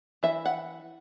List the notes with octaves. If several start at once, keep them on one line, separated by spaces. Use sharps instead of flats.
E3 E5
F#5